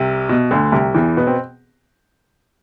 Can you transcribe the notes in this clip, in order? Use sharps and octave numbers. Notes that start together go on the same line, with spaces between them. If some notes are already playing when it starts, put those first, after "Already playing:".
Already playing: C2 C3
B2
D2 D3
C2 C3
E2 E3
B2 B3
C4